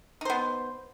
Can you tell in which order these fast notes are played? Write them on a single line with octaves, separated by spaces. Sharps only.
D#4 C5 B3